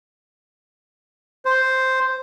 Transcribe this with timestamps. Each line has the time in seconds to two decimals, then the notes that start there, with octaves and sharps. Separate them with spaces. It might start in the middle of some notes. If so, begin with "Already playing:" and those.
1.45 C5